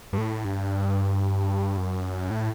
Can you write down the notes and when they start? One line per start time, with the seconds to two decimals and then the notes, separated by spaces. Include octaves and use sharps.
0.13 G2
0.18 A2
0.45 G2
1.77 F#2
2.31 A2